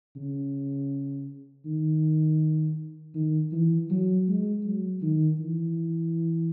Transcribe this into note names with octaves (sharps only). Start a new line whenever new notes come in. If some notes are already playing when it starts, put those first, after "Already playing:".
C#3
D#3
D#3
E3
F#3
G#3
F#3
D#3
E3